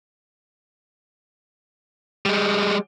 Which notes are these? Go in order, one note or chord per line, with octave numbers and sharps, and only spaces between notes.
G3 G#3